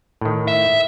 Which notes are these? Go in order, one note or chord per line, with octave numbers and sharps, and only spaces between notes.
A2 D#3
E5